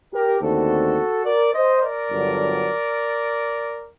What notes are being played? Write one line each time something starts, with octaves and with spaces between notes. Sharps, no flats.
G4 A#4
D#2 D3 A3 C4 F#4 A4
A#4 D5
C5 D#5
A#4 D5
G1 G2 D3 F#3